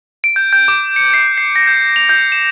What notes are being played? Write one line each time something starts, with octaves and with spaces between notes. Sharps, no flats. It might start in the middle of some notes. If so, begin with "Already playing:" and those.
D7
G6
G6
D6
C#7
C7
C7
A#6
G6
F7
G6
E7